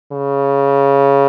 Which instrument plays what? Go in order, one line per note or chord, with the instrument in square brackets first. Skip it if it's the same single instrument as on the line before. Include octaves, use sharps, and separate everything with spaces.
[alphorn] C#3